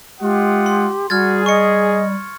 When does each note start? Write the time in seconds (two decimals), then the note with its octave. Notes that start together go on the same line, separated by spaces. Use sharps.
0.21 G#3 F4 G4 F#5 D#6
0.66 C6
1.10 G3 F#4 G#4 F6 G#6 A6
1.46 D#5 C#6 C#7